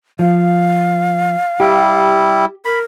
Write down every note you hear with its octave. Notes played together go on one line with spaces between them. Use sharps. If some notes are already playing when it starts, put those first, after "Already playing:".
F3 F5
G3 E4 G4
A#4 B5